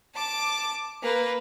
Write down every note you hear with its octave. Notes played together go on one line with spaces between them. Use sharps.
A5 D6
A#3 B4